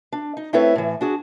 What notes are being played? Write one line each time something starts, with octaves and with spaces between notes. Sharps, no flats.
D4
D#4
A3 C4 E4 A4 B4 C#5
A2 E3
D4 F#4 G#4